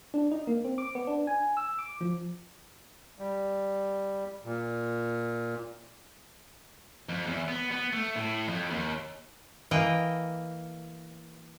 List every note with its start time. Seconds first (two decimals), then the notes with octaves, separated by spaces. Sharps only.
0.14 D4
0.31 D#4
0.47 A#3
0.65 C4
0.78 D6
0.95 B3
1.07 D4
1.27 G#5
1.57 E6
1.79 D6
2.01 F3
3.19 G3
4.45 A#2
7.09 F2
7.27 E2
7.48 B3
7.71 B3
7.93 A3
8.16 A2
8.48 F2
8.70 D#2
9.71 E3 A#3 D#5 G5